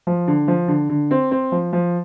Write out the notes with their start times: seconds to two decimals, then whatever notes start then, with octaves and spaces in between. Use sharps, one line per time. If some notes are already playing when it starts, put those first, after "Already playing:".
0.07 F3
0.28 D3
0.48 F3
0.68 D3
0.89 D3
1.11 C4
1.31 C4
1.52 F3
1.73 F3